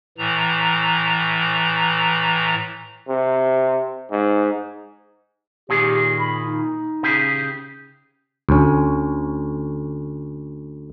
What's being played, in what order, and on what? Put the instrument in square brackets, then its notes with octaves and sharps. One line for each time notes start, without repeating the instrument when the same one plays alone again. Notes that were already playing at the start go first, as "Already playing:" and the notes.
[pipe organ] A2 E3 A#5
[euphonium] C3
G#2
[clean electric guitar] A#2 D#3 G#4 [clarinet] G4
[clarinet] B5
D#4
[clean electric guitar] C#3 G4 G#4
[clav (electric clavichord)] D2 C#4